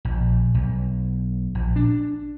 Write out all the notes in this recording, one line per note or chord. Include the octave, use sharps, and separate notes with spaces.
A#1
B1
A#1
D4